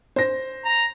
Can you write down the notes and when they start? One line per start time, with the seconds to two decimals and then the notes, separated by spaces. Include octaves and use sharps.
0.16 C5 A#6
0.65 A#5